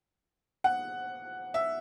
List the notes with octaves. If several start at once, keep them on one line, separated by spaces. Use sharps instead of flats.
F#5
E5